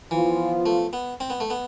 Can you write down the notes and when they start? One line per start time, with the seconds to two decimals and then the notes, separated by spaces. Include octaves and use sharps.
0.11 E3 F3 B3 F4
0.66 A3
0.93 B3
1.20 C4
1.30 B3
1.40 A3
1.50 B3